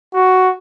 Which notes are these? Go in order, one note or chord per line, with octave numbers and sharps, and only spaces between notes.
F#4